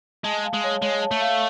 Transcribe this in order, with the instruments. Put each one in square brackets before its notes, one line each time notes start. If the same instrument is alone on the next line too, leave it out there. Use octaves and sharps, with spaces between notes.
[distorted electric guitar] G#3 [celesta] A5
[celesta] F5
[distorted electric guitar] G#3
[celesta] C#5
[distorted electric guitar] G#3 [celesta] C#5
[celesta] A5
[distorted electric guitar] A3
[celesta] F5